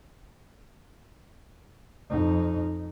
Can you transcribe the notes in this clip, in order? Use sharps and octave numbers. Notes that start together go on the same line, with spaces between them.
F2 D#4